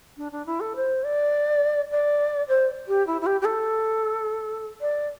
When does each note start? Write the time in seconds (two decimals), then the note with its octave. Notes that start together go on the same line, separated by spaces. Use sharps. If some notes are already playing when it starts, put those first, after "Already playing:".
0.17 D4
0.32 D4
0.46 E4
0.60 A4
0.76 C5
1.04 D5
1.91 D5
2.48 C5
2.88 G4
3.07 E4
3.21 E4
3.26 G4
3.41 G4
3.45 A4
4.81 D5